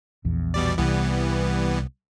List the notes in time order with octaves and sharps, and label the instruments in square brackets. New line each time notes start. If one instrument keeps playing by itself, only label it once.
[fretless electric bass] A#1 E2
[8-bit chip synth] B2 G3 D5
[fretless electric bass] C2 [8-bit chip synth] E3 G3 B3